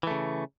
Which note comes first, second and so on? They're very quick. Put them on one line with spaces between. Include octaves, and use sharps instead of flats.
E3 A3 C#3